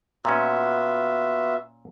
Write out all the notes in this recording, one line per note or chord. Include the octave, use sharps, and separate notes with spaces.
A#2 B3 C#4 F4 F#4 E5